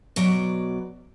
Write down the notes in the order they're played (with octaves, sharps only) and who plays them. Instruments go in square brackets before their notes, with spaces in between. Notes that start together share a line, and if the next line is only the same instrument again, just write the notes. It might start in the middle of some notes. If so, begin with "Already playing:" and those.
[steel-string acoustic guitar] B2 F#3 D5